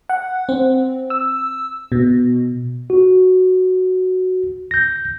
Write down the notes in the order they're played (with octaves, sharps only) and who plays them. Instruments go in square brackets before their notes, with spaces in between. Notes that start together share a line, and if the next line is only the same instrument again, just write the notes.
[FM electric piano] F#5
C4
E6
B2
[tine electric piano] F#4
G6 A#6